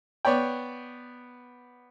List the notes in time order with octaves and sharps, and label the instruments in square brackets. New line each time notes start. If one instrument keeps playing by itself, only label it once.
[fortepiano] B3 C#5 D5 G5